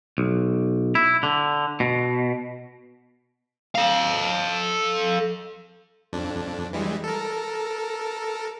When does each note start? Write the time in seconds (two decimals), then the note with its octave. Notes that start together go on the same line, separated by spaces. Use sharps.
0.18 B1
0.95 E4
1.23 D3
1.80 B2
3.75 A4 F5
6.13 F2 D4
6.73 E3 G3 G#3
7.04 A4 A#4